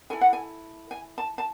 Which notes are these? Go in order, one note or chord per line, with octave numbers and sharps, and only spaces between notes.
E4 A4 G#5
F#5
G#5
G#5
A5
A5